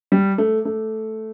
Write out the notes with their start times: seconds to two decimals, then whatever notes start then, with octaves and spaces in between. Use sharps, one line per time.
0.12 G3
0.38 A3
0.65 A3